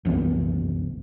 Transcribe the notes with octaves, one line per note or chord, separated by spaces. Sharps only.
F#1 C2 E3 B3